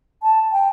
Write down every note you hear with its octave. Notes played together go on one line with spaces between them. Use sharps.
A5
G5